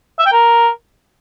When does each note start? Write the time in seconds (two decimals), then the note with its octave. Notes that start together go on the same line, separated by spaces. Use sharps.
0.19 E5
0.26 G5
0.33 A#4